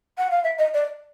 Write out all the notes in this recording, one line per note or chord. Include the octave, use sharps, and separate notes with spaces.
F#5
F5
E5
D#5
D5